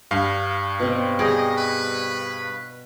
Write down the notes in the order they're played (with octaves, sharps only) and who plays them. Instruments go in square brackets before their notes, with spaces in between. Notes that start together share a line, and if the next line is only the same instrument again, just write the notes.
[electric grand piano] G2 F5 [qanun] C#6
[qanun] B2 C4
[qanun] G3 G4 G#4 [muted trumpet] D#5
[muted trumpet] B4